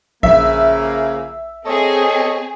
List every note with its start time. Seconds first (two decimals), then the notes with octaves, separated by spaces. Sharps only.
0.23 A#1 C#3 F3 A#3 E5
1.66 C4 G#4 A4 C#5 D#5